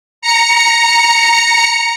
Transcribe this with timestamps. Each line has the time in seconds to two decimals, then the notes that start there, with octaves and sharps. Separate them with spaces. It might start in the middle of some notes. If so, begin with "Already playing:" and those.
0.22 A#5 C#7